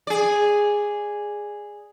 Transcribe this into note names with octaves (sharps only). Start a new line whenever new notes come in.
G#4 D5